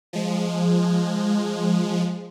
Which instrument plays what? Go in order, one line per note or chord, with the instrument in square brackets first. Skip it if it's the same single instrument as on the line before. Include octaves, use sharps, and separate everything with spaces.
[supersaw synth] F3 G#3